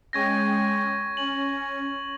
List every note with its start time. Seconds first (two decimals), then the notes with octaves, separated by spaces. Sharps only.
0.13 G#3 C#4 G5 C#6 G#6 A#6
1.17 C#4 F#7